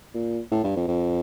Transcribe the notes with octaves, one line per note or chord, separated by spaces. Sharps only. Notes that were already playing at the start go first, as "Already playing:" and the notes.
A#2
A2
G2
F2
F2